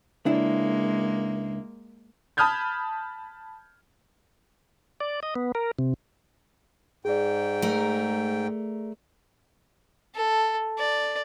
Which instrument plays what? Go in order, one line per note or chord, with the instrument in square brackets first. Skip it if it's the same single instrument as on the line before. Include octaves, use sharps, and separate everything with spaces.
[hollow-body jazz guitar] C#2 D4 E4 [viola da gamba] G#3 A#3
[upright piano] A5 B5 D#6 F6 G6 G#6
[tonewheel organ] D5
D#5
B3
A#4
C3
[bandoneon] G#2 G5 [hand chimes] G#4 D5
[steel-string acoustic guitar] A3 A#4
[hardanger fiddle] A4
D5